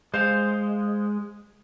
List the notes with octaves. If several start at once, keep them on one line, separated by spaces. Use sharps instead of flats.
G#3 C5 F5 C6